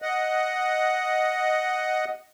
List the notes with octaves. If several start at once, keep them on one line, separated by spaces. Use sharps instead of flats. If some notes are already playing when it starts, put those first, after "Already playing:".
D#5 F#5